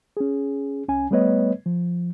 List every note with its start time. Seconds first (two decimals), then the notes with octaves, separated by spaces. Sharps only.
0.17 C#4 G#4
0.88 C2 C#4 G#5
1.11 G3 A3 B3 B4 C#5 D#5
1.66 F3